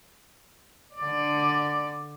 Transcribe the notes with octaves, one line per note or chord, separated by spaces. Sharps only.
D3 D5